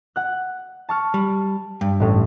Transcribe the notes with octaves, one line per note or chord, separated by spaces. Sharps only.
F#5 F#6
A5 C#6 F6
G3
G2
A1 A2